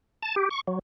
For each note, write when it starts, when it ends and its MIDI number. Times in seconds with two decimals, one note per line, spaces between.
0.22 0.35 81
0.36 0.49 67
0.51 0.61 85
0.67 0.79 54